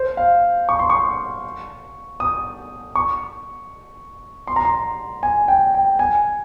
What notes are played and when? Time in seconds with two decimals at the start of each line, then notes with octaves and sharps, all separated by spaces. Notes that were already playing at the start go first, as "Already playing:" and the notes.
Already playing: C5
0.17 F5
0.69 C#6
0.79 C6
0.90 C#6
2.20 D#6
2.95 C#6
4.47 C6
4.56 A#5
4.65 C6
5.23 G#5
5.48 G5
5.74 G5
5.99 G#5